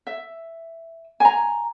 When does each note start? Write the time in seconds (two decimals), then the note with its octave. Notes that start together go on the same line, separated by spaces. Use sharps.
0.07 E5
1.20 G#5 A#5